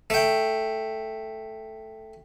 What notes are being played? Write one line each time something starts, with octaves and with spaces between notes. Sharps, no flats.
A3 G5